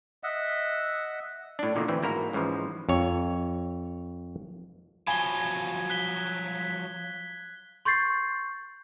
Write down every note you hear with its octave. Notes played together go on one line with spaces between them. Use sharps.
D#5 E5 F#5
A2 D4
E2 A#2 D3 D#3 A#3
D2 E3 C4 C#4
G#2 A#3 E4 F#4 A#4
C#2 G#2 C#3 E3 F3
F2 C#5
F3 F#3 G#5 B5 G#6 G7
F#6 B6 G7
B6
C6 C#6 G6 A6 C7